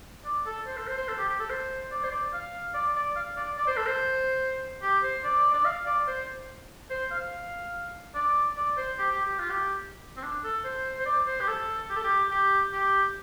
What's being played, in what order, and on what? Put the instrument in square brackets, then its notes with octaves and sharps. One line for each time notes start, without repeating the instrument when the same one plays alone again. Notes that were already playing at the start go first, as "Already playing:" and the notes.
[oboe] D5
A4
C5
A4
C5
C5
A4
G4
G4
A4
C5
D5
C5
D5
F5
D5
D5
F5
D5
D5
C5
A4
C5
G4
C5
D5
D5
F5
D5
C5
C5
F5
D5
D5
C5
G4
G4
G4
F4
G4
C4
D4
A4
C5
C5
D5
C5
G4
A4
G4
A4
G4
G4
G4